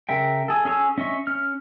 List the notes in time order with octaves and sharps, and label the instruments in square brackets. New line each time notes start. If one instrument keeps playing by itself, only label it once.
[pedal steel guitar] C#3 A#4 E5 G5
G#4 A4
C#4 G#4 C#5 E6
C#4 D#5 E5 C#6
C#4 F6